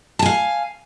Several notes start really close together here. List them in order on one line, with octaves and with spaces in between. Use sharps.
A5 G#5 F5